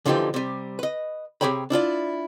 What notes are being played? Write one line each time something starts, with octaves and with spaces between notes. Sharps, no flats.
A#2 D3 E3 F3 D#4 G4
C3 G3
B4 D#5
C3 G4 G#4 C#5 G5 B5
D4 E4 F4 D5